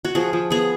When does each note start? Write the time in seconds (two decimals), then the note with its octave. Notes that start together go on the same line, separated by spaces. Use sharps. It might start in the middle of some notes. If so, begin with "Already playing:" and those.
0.05 F#4
0.15 F3 G#4
0.33 F3
0.50 B3 G#4